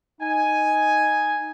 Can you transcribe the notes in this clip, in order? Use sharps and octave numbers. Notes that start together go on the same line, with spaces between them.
D#4 G#5